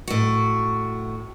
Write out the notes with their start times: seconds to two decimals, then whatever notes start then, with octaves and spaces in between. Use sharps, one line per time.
0.08 A2 F#4